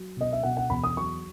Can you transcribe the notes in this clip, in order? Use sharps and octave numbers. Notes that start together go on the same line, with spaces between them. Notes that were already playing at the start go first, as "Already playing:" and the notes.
Already playing: F#3
B2 D#5
E5
B2 F#5
F#5
E2 B5
D#6
F#3 C#6